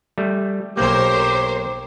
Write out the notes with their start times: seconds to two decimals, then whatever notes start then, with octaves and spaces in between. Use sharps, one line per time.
0.18 G3 A3
0.77 B1 A#3 G4 A#4 C5 C#5